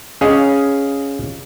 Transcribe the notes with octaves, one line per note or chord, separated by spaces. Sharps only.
C#4 G#4 D#5 F5